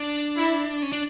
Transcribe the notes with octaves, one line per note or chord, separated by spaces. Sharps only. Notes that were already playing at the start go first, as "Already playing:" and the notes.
Already playing: D4
E4
C#4
D4